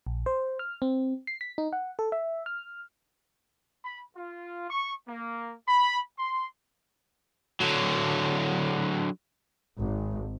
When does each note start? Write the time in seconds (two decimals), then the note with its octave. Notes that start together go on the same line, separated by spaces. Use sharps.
0.07 A#1
0.26 C5
0.59 F6
0.82 C4
1.27 C7
1.41 B6
1.58 D#4
1.73 F#5
1.99 A4
2.12 E5
2.46 F6
3.83 B5
4.16 F4
4.70 C#6
5.08 A#3
5.68 B5
6.18 C6
7.61 D3 F#3
9.78 G#1